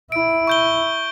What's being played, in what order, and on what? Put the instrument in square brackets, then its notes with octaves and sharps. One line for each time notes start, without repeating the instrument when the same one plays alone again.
[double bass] E4 [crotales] D7
[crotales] C#6 G6 G7